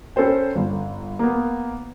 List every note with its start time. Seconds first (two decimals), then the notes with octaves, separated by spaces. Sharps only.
0.16 C#4 A4 B4 C5 G5
0.55 G1
1.19 A#3 B3